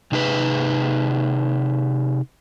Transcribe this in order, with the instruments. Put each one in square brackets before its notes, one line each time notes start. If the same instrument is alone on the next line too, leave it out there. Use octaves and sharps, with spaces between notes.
[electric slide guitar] C3 D#4 G#4 B4